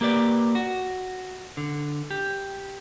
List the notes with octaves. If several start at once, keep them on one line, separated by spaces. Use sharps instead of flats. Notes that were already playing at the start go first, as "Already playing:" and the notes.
A#3 G4 B4 D5
F#4
D3
G4